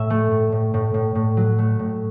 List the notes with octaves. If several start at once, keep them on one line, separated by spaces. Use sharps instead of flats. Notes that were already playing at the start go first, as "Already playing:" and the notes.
Already playing: A2 E5
A3
A2
A2
A2
A2
A2
F#3
A3
A2